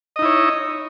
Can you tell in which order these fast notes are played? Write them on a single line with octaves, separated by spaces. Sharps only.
D#5 D#4 E4 C#5